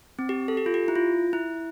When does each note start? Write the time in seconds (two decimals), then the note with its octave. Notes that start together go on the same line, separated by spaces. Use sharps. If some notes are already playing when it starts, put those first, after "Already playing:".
0.19 C4
0.29 G4
0.48 A4
0.57 G4
0.66 F4
0.74 G4
0.88 E4
0.95 F4
1.33 E4